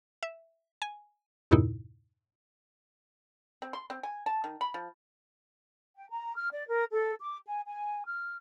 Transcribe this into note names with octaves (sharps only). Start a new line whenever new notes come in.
E5
G#5
E2 G2 A#2 C#3 D#4 E4
C4
C6
C4
G#5
A5
D#3
B5
F3
G5
A#5
F6
D5
A#4
A4
D6
G#5
G#5
F6